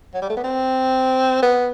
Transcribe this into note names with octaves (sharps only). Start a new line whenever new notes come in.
F#3
G3
A3
B3
C4
B3